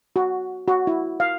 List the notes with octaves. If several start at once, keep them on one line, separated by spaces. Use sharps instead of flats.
F#4
F#4
E4
F5